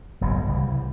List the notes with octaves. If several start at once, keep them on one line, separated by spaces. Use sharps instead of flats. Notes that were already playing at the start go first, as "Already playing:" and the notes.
F#1 B1 G#2 B2
C2 C#3 E3 G3